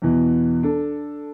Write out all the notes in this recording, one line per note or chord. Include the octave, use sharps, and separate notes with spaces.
E2 B2 E3
D4 A4